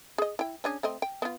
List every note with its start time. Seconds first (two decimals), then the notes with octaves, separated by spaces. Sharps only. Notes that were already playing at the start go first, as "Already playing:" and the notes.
0.18 G#4 D#5
0.39 E4 G5
0.64 C#4 D4 G#4
0.83 A3 C4 D#5
1.02 G5
1.22 B3 F4